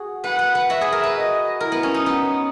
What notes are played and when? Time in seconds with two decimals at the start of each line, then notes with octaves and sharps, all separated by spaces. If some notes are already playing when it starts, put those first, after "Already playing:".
Already playing: F#4 G#4
0.24 B4 F#5
0.39 B4
0.55 B4
0.69 F#4 E5
0.81 G#4
0.92 A#4
1.03 B4
1.15 D#5
1.60 E4 A#4
1.72 B3
1.83 C#4
1.94 D#4
2.06 B3